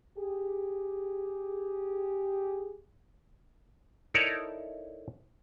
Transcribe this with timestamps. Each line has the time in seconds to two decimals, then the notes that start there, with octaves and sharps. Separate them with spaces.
0.17 G4 G#4
4.14 D#4 E4 A4 A#4 C#5 D5